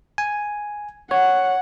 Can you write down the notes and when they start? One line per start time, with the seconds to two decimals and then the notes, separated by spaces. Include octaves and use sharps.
0.18 G#5
1.11 C#5 F#5